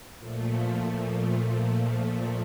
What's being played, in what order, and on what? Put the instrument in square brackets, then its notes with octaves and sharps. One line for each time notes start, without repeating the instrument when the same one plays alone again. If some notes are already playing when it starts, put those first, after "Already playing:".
[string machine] A#2 F3 A3